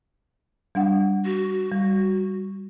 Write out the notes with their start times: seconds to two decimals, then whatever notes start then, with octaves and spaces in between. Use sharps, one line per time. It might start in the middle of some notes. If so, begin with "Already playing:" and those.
0.75 G3 D4 F#5
1.25 F#4
1.72 G3